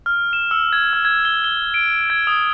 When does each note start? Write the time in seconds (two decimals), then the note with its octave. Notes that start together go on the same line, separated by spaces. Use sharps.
0.06 F6
0.33 E7
0.51 E6
0.73 G#6
0.93 F6
1.05 G#6
1.25 G7
1.44 G7
1.74 D7
2.10 G#6
2.27 D#6